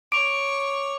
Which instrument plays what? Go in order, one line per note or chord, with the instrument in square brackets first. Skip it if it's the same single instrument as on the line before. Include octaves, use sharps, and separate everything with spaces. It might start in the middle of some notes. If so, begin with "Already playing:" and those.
[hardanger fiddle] C#5 C#6 [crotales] D6 F7 [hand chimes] D7